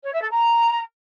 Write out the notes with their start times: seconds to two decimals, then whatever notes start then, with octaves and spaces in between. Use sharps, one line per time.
0.03 C#5
0.12 E5
0.21 A4
0.30 A#5